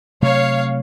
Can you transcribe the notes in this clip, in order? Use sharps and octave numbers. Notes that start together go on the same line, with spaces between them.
C3 F#3 A3 C#5 F5